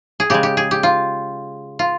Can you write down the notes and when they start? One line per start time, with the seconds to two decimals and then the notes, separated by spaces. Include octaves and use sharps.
0.20 G#4
0.30 C#3 G#3 G4
0.43 G4
0.57 G#4
0.71 G4
0.83 F4
1.79 F4